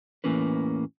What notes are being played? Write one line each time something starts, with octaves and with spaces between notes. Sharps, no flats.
E2 A2 E3 A#3 C#4 B4